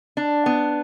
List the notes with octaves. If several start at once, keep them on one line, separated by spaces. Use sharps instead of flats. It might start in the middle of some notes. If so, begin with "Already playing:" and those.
D4
B3